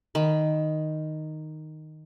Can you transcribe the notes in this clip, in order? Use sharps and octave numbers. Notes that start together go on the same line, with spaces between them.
D#3 B5